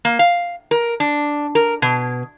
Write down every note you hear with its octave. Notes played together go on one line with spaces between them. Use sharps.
A#3
F5
A#4
D4
A#4
B2